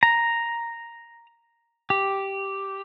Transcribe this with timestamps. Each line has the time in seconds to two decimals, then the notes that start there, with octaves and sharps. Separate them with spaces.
0.03 A#5
1.90 G4